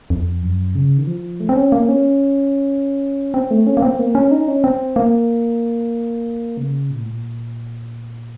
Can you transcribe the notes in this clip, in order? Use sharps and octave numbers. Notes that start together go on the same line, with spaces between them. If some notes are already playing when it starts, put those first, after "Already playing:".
F2
F#2
C#3
D#3
F3
A3
C4
C#4
A#3
C#4
C4
A3
C#4
A#3
C4
A#3
C#4
D#4
C#4
C4
A#3
C#3
A#2
A2
A#2